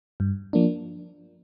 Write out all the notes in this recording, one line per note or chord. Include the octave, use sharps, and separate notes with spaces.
G2
F3 A#3 D4